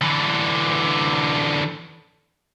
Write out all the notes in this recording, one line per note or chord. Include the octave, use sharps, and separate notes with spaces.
D3 E3